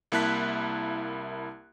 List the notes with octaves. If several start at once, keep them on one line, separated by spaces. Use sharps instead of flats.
C2 A#3 E4 A5 F#6 B6